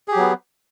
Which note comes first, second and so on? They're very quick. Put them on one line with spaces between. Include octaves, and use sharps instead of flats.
G#4 G4 F#3 B3